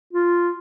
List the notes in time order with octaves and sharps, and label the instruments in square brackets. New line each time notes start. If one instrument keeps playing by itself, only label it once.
[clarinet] F4